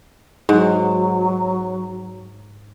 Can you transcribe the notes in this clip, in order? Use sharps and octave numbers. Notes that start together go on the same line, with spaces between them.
G#2 F#3